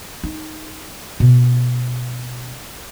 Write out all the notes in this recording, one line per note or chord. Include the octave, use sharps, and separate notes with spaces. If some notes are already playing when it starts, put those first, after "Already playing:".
D#4
B2